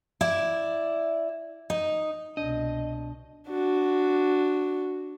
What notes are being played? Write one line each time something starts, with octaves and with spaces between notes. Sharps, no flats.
E4 D5
D#4
C2 B2 D4 D#5
D4 F#4